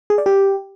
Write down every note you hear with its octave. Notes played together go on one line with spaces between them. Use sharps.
G#4
D5
G4